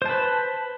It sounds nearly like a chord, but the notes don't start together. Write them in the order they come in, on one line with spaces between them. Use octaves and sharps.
C5 A5 B4